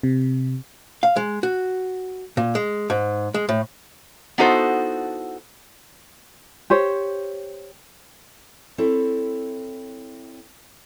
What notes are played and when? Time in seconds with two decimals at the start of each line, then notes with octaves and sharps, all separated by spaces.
0.03 C3
1.03 F5
1.16 G#3
1.43 F#4
2.37 A#2
2.55 G#3
2.90 G#2
3.34 G#3
3.49 A2
4.38 B3 D#4 E4 F#4 A4 C5
6.70 G4 C5 C#5
8.78 C4 E4 A4 C#5 E5